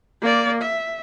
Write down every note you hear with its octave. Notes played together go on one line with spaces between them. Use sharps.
A#3 D5
E5